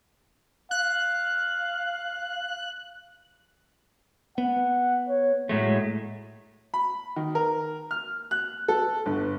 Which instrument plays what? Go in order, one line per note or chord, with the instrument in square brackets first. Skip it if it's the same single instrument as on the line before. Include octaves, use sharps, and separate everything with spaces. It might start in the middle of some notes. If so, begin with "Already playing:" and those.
[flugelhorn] F5 [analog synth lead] F#6
[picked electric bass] B3 [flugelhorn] F#5
[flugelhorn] C#5
[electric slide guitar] A2 G#3 A3 [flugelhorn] F#3
[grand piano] B5
D#3
A#4
F6
F#6
A4
G1